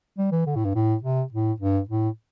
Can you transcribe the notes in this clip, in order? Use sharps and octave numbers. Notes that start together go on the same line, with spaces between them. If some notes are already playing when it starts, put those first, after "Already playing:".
G3
E3
D3
A2
G2
A2
C3
A2
G2
A2